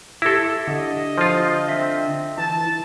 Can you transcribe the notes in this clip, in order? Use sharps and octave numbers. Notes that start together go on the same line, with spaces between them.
E4 G4 A4 D6 A#6
D3 D#5
F3 F4 C5 F6 G6
C4 E5 B6
E3 A5